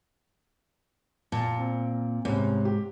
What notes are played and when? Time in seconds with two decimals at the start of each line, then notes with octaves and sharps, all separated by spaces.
1.32 A#2 A5
1.59 C4
2.25 C2 G#2 C#4
2.65 G4